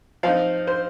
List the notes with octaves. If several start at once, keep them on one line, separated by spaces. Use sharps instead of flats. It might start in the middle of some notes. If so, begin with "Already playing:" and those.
F3 C4 D#4 F5
C5